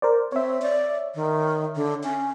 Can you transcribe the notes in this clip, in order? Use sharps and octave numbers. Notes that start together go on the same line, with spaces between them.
A#4 C5 D5
C4 C#5 E5
D5
D#3
D3
C#4